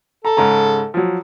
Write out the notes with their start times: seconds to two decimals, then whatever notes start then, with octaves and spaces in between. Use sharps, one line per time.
0.25 A4 A#5
0.37 G#2 C#3 A#5
0.94 F3 F#3